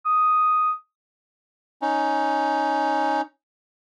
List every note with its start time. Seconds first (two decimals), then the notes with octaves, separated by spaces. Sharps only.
0.06 D#6
1.82 C#4 D#4